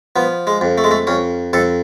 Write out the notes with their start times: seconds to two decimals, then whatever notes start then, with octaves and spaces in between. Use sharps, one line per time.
0.16 F3 B3
0.47 G#3
0.61 F2
0.78 A3
0.84 G#3
0.91 A3
1.07 F2 C#4
1.53 F2 A4